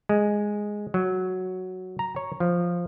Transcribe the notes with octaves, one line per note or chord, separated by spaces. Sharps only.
G#3
F#3
A#5
C#5
F3